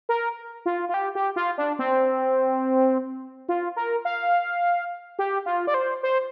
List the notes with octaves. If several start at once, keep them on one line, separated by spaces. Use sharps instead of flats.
A#4
F4
F4
G4
G4
F4
D4
C4
F4
A#4
F5
G4
F4
D5
C5
C5